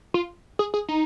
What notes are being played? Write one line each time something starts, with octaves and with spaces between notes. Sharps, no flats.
F4
G#4
G#4
D#4